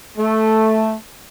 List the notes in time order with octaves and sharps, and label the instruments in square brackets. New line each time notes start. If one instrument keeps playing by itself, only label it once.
[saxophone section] A3